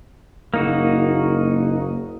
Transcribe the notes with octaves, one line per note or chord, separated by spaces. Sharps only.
F#1 A#3 D#4 F#4